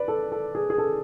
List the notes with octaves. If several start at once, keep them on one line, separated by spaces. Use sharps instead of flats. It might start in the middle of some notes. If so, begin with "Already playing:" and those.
Already playing: B4 D5
A4
A4
G#4
G#4
A4